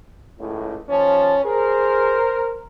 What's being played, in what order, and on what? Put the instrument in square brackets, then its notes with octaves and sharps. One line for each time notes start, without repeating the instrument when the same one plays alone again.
[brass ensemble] C#2 A2
[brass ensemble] D#2 F3 A5 [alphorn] C#4
[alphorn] G#4 [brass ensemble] A#4 C5